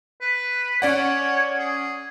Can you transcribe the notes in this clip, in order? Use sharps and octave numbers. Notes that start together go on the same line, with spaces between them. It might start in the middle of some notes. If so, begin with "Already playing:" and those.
B4
C#4 C#5 D5 F#5
G#4